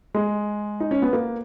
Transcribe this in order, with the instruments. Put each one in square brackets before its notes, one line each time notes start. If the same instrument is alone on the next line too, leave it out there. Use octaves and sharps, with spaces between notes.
[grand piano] G#3
D#4
C#4
B3
A#3